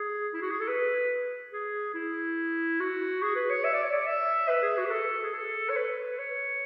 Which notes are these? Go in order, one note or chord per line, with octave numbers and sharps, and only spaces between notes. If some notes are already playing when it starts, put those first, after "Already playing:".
Already playing: G#4
E4
F#4
G#4
A4
B4
G#4
E4
F#4
G#4
B4
C#5
E5
D5
C#5
D5
E5
B4
G#4
F#4
B4
A4
G#4
A4
C#5
B4
C#5